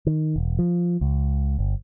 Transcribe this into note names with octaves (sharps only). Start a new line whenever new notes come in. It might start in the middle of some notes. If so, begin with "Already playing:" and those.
D#3
E1
F3
C#2
G1